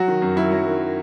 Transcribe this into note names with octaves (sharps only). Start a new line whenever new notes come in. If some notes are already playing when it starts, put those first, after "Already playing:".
Already playing: F#3 F#4
D#3
F#2
F#2 E4
F#3
D#3